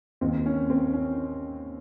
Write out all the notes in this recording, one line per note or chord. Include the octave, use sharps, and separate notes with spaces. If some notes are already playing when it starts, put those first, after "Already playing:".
D#2 D#3 C4
C#4
C4
C#4